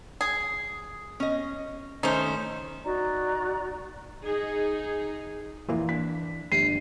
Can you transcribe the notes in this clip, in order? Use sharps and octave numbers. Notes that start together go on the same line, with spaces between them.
G#4
C#4 D#5
D#3 A3 C#4 D#4 C5
D#4 F#4 D5 A#5
D#4 G#4
F2 A#2 E3 A#3
D4 B6
G1 G4 C7 D#7